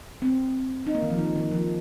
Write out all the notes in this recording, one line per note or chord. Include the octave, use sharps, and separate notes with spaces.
C4
D#4
A#3
D#3
F3
D#3
D#3
F3